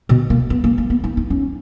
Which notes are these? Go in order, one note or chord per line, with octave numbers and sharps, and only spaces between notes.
B2
A#3
B3
A#3
A#3
B3
D#4
D#4
C#4